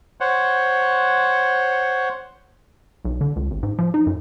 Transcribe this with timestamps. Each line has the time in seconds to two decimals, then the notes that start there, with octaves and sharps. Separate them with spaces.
0.20 C5 C#5 F#5
3.05 B1
3.21 D3
3.36 C#2
3.51 G#1
3.63 G#2
3.78 F3
3.94 D#4
4.07 F#2